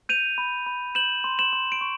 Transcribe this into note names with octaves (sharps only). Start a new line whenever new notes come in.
G6 D#7 F7
B5
B5
G6 E7 F#7
C6
E7 F#7
C6
D7
C#6